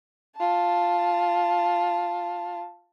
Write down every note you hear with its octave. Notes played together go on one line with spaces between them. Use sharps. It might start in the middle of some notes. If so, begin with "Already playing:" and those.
F4 A5